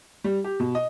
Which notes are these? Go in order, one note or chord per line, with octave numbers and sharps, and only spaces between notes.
G3
G4
B2
D#5